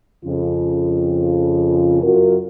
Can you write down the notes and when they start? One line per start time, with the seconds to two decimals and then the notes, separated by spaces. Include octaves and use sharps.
0.24 F2 C#3 F4
2.02 F#2 F4 F#4 A#4